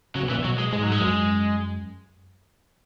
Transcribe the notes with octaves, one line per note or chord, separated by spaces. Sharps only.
C#3 F#3
B2
A#2 E3
B2
F#3
G#3
G#2 G#3
F#3
G#3
F#2